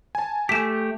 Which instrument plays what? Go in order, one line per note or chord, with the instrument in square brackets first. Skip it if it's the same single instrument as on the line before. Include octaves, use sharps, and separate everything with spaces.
[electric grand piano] G#5 A5
[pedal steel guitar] A3 G4 [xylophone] B6 E7